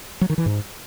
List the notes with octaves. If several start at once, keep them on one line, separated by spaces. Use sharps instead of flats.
F#3
D#3
E3
G#2